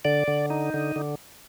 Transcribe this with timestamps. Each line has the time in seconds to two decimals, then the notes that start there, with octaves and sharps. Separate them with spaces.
0.05 D3 D5
0.28 D3
0.50 D#4
0.74 D3
0.96 D3